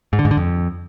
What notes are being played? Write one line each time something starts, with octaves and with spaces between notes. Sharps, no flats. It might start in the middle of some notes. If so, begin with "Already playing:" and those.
G#2
D3
G#2
D3
F2